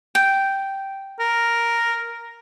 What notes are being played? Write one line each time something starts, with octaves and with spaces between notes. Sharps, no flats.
G5
A#4